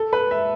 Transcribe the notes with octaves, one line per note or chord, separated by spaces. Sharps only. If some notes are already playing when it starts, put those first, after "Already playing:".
Already playing: A4
B4
E5